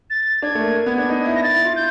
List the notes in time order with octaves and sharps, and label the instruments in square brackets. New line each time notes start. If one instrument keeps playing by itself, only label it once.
[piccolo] A6
[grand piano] D4 [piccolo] G#6
[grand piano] A3
A#3
A#3
B3
D4
D#4
E4
[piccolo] A#6
[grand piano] E4 [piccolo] A6
[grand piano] E4
F4
[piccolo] G6